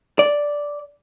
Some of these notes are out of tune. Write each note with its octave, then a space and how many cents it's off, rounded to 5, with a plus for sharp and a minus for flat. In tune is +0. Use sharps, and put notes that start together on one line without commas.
D5 -5